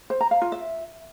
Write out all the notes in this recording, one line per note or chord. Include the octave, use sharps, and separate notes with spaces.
C5
A#5
F5
F4
E5